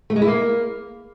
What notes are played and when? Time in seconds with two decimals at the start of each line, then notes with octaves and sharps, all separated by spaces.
0.10 A3
0.16 G#3
0.22 E4
0.28 A#3